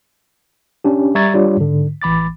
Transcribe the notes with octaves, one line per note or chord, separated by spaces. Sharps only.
C#4 D4 G4
G3 E5 A#5 C#6 G#6 A6
G3 D4 F4 C#5 D5
G#2 D3
A1 E3 B5 D6 A6